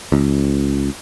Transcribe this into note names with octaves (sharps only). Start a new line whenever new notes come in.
C#2